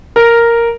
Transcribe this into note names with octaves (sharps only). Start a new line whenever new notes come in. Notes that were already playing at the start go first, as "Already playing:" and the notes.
A#4